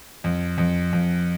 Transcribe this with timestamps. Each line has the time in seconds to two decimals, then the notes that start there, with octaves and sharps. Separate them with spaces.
0.24 F2
0.58 F2
0.93 F2